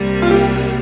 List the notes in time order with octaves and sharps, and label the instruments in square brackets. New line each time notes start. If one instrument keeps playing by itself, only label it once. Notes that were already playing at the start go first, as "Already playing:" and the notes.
Already playing: [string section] C2 C3 G3 A#3
[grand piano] F4
G4